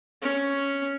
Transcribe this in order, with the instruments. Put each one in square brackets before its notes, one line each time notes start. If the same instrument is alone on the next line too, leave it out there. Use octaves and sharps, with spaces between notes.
[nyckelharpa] C#4